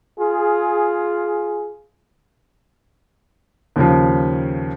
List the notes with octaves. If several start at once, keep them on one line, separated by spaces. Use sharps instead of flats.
F4 G#4
D#2 C#3 F3